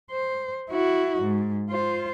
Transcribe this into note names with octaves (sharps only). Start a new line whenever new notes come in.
C5
E4 F#4
G#2
F4 C5